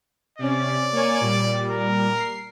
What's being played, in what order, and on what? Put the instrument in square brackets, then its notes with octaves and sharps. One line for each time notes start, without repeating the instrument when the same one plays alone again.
[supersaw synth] C3 C#4 [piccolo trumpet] D5
[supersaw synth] A#3 C#5 G#5
A#2 G3
[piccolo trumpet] A#4
[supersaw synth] C7